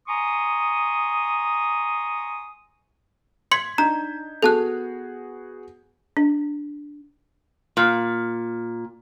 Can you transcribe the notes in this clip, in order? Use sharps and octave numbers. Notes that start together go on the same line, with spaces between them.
G#5 A#5 C6 C#6 D#6
C6 G#6 B6 C#7 F#7
D4 D#4 A#5 G6
B3 F#4 G#4 A4 A5 F#6
D4
A#2